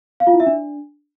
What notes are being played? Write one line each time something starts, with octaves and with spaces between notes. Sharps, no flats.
F5
F4
E4
E5
D4